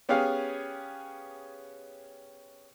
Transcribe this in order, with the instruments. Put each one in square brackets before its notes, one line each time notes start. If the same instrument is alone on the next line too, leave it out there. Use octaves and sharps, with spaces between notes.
[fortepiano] B3 C#4 G4 G#4 F5